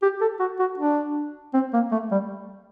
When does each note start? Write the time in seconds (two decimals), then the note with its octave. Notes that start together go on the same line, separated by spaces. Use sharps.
0.02 G4
0.21 A4
0.40 F#4
0.59 F#4
0.78 D4
1.54 C4
1.74 A#3
1.92 A3
2.12 G3